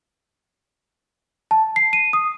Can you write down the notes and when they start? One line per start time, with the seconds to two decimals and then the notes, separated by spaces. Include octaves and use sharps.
1.51 A5
1.76 C7
1.93 D#7
2.13 D#6